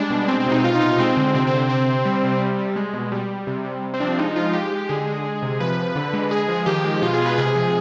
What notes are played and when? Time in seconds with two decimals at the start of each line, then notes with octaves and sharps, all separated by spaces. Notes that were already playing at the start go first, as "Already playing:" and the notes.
Already playing: G3 G#3 D4
0.10 B2
0.28 G#3 C4
0.40 C4
0.46 C3
0.52 D#4
0.63 B2 F4
0.75 D#4
0.82 B2
0.87 D#4
0.99 G#3 C4
1.17 D3
1.34 C3 C4
1.47 C4
1.53 C3
1.70 C3 C4
1.88 C3
2.05 G3
2.24 C3
2.41 G3
2.59 G3
2.76 G#3
2.94 B2
3.12 G3
3.29 G3
3.47 C3
3.65 C3
3.82 C3
3.94 C4
4.00 F3 D4
4.18 G#3 D#4
4.35 G#3 F4
4.53 G#3 G4
4.72 G#3
4.89 D3 G#4
5.07 G#3
5.25 G#3
5.42 C3
5.60 F3 B4
5.78 C3
5.96 D3
6.13 G#3
6.31 G#3 G#4
6.49 F3
6.66 D#3 G4
6.84 G#3
7.02 B2 F4
7.14 G#4
7.20 G#3
7.26 B4
7.38 C3 G#4
7.55 F3